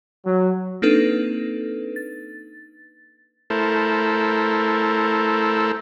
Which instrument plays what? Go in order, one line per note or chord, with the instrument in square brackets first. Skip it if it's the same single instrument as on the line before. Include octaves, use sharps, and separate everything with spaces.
[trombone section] F#3
[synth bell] A#3 C4 D4 D#4 A4 B4
A6
[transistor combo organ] A3 E4 A4 A#4 C5